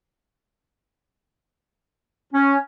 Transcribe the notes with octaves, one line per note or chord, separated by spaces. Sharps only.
C#4